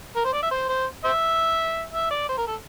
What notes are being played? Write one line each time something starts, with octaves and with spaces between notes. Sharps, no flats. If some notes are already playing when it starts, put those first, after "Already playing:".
A#4
C5
D5
E5
C5
C5
C5 E5
E5
D5
C5
A#4
A4